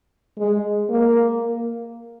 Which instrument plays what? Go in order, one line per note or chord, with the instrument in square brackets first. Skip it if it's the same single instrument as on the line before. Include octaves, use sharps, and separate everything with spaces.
[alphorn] G#3
A#3